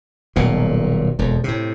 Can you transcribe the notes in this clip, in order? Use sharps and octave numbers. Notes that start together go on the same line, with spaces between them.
D#1 B1 A#2
E1 F2
A2 C3